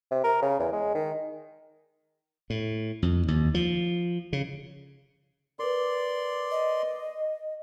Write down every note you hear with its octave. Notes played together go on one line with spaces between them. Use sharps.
C3
A#4
C#3
E2
G#3
D#3
A2
F2
D#2
F3
C#3
A#4 B4 D5 C6
D#5